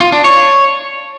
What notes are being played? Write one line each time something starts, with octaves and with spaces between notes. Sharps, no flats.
F4
D4
C#5